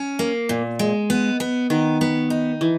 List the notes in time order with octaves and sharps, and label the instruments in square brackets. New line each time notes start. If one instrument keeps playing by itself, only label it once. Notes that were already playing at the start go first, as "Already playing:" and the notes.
Already playing: [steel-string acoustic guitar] C#4
A#3
A#2
G#3
B3
B3
[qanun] D#3 [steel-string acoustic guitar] B3
[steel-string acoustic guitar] B3
D#4
[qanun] E3